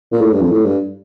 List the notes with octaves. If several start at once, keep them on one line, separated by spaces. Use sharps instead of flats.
A#2
A2
G2
F2
A2
G2